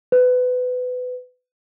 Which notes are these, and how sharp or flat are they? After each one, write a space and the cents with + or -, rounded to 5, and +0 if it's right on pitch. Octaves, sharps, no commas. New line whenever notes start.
B4 +25